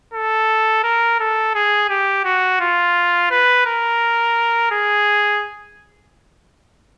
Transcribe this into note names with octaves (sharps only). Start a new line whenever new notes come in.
A4
A#4
A4
G#4
G4
F#4
F4
B4
A#4
G#4